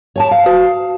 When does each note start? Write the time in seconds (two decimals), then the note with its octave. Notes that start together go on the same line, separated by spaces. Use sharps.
0.16 C#5 G#5 A5
0.31 F5
0.46 F#4